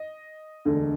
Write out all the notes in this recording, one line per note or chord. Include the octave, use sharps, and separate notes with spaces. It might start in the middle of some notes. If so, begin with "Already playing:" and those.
Already playing: D#5
E1 D2 D3